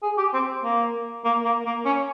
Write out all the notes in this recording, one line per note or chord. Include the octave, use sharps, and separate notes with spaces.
G#4
G4
C4
A#3
A#3
A#3
A#3
C#4